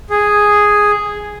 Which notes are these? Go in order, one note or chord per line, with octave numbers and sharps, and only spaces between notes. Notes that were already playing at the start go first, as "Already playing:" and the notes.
G#4